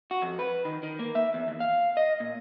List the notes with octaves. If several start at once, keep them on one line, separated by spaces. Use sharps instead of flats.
F#4
F2
B4
D#3
D#3
A#3
E5
E2
D#2
F5
D#5
A#2